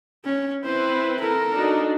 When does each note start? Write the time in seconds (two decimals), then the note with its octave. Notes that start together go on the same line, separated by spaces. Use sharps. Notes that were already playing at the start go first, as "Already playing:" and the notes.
0.25 C#4
0.64 C4 E4 B4 C5
1.19 A4 A#4
1.53 D4 D#4 F#4